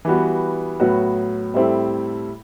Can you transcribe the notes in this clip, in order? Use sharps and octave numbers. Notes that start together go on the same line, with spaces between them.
E3 G3 B3 F#4
A2 F#3 B3 F#4
A2 G3 C4 E4 A4